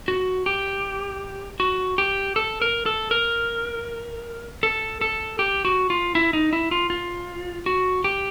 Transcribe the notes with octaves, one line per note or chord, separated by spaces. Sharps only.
F#4
G4
F#4
G4
A4
A#4
A4
A#4
A4
A4
G4
F#4
F4
E4
D#4
E4
F4
F4
F#4
G4